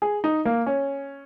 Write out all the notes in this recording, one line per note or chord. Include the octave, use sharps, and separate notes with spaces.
G#4
D#4
A#3
C#4